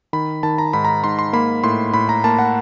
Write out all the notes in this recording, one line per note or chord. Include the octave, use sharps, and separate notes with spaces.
D#3 B5
D#3 A5
A#5
G#2 B5
A#5
B5
G#2 C6
C6
A#3 B5
A2 C6
A2 B5
A#5
A#3 A5
F#5